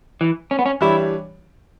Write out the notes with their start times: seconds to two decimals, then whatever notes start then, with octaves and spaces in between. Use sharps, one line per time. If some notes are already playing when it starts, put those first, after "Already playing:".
0.21 E3
0.51 C#4
0.59 B3
0.66 C#4
0.81 E3 G3 D4 E4 G4 C#5